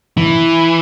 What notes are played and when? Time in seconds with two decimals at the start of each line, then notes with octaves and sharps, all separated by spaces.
0.17 E3